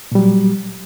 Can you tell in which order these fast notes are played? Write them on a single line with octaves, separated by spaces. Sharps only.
A#2 G3 F#3